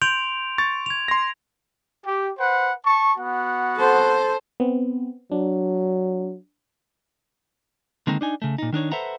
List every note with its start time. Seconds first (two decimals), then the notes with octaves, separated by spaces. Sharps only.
0.02 C6 G6 D7 F7
0.58 C#6 A6
0.86 G#6 F7
1.08 C6 A#6
2.03 G4
2.37 B4 C5 F#5
2.85 A5 C#6
3.17 B3 F#4 F#5
3.77 A4 C5
4.60 B3 C4
5.32 F#3 D4
8.07 D3 D#3 G#3 A#3 C4 D#4
8.21 D4 D#4 G#5
8.42 C#3 A3
8.58 A#2 D#4
8.73 D#3 D4 D#4 C#5
8.92 A4 B4 C5 E5 F#5 A#5